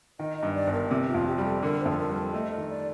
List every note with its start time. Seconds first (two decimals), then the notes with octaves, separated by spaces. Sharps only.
0.19 D#3 D#5
0.38 D#5
0.43 G2
0.55 D5
0.67 G1
0.73 A#4
0.91 C3
1.08 F4
1.14 F2
1.27 G4
1.38 G3 G4
1.45 A4
1.62 D3 A#4
1.80 C5
1.86 F2
1.91 A4
1.98 A#4
2.10 G3
2.15 A4
2.33 A3 D#5
2.52 D#5
2.57 D#3
2.69 D5